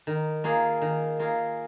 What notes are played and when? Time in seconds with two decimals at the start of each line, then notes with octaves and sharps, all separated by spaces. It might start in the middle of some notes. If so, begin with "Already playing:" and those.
0.07 D#3
0.44 A#3 F4 G#4
0.82 D#3
1.19 A#3 F4 G#4